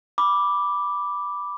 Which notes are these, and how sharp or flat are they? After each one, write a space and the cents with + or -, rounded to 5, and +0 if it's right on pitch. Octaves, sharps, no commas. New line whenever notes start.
B5 -5 D6 +0